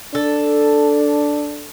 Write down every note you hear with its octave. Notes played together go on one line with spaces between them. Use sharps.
D4 A4